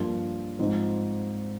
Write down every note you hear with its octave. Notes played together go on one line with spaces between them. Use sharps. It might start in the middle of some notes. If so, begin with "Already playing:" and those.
Already playing: G2 F3 A#3 F4
G#2 F3 C4